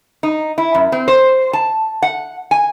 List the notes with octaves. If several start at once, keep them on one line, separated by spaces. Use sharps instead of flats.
D#4
E4
F#2
C4
C5
A5
F#5
G#5